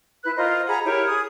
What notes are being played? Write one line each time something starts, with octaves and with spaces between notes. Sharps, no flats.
E4 B4 F#6
F4 A#4 C5 D#5
G#4 F#5 A#5 B5
E4 G4 A#4 C#5
G#4 D#6